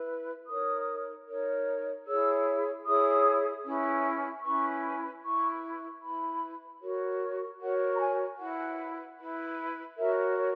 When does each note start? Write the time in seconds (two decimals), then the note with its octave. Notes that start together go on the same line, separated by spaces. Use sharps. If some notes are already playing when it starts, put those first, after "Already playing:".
Already playing: E4 B4
0.47 D#4 A#4 C#5 D#6
1.26 D#4 A#4 C#5
2.06 E4 G#4 C#5 E6
2.85 E4 G#4 C#5 D#6
3.65 C#4 E4 B4
4.43 C#4 E4 B4 C#6
5.23 E4 B4 C#6
6.02 E4 B4 B5
6.82 F#4 A#4 C#5
7.60 F#4 A#4 C#5 F#5
7.96 A#5
8.00 G#5
8.39 E4 F#5
8.44 B4
9.19 E4 B4
9.98 F#4 A#4 C#5 E5
10.38 C#5